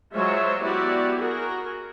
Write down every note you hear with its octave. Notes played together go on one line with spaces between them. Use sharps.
F#3 G#3 F4 C5 C#5 E5
B3 E4 F#4 G4 D5
F#4 G#4 A#4